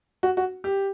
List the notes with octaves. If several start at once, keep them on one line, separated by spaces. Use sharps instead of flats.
F#4
F#4
G4